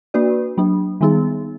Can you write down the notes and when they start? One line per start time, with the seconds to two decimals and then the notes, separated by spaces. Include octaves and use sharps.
0.14 A#3 D4 F#4 B4 D5
0.57 F#3 A#3 D4
1.01 D#3 G3 B3 D#4 G#4